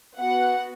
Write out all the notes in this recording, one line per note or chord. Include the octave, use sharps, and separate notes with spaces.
B3 F#4 F#5